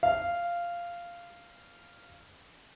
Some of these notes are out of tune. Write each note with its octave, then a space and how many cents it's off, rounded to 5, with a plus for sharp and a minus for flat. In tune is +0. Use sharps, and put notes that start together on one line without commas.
F5 -10